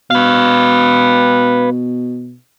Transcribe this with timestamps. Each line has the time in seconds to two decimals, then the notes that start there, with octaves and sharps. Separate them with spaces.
0.11 B2 B4 F5